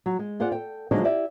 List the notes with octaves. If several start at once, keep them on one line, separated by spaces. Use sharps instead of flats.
F#3
G#3
F4 G#4 C5 D5 F#5
A4 G5
D3 F3 F#3 G#3 D4 D#4
E4 G4 D5 E5